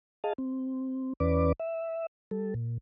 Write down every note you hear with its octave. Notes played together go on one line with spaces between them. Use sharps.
G#4 D#5 F5 A5
C4
E2 E3 C#4 B4 D5 D6
E5
G3 A4
A#2